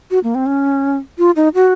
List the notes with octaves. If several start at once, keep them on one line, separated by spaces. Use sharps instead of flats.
F#4
A#3
C4
C#4
F4
D#4
F#4